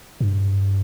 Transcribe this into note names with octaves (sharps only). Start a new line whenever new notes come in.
G2